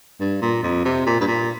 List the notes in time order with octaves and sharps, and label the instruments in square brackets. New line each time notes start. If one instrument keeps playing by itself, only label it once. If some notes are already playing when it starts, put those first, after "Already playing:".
[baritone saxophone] G2
A#2
F2
C3
A#2
G2
A#2